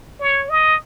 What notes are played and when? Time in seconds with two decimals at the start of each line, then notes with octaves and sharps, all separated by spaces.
0.20 C#5
0.49 D#5